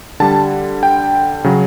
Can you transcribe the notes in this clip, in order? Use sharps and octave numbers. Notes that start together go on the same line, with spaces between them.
D3 G3 A5
G5
C#3 F#3